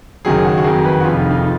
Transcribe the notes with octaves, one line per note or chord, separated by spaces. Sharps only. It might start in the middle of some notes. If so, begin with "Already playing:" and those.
F#1 F#2 D#3 F#3 G#4
F#4
F#4
F2 D#3 F#3 G#4
B4
F#4
F1 F2 F3 F4
D#4
D#4